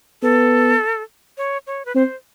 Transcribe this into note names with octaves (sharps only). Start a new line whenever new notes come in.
B3 A4
C#5
C#5
B4
C4 C5